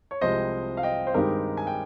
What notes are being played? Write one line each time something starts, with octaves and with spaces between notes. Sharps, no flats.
C#5
C2 C3 F3 G#3 C4 C5 D#5
F5
D#5 G5
C5
G2 D#3 G#3 C4 D#4 G4 A#4
G#5
G5